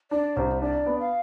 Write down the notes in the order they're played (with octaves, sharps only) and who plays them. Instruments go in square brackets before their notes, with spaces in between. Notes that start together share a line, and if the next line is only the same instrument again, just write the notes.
[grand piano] D4 [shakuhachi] D5
[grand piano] C2 [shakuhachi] C5
[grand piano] D4 [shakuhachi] D5
[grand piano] B3
[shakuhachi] F5